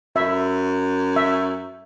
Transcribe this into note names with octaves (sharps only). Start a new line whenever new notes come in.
F#2 E5
E5